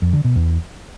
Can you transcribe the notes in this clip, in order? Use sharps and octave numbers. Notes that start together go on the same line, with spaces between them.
F2
D3
B2
E2